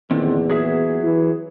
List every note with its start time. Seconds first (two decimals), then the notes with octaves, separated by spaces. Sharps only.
0.11 E2 A#2 D3 D#3 C4
0.50 F#3 G#4 E5
1.02 E3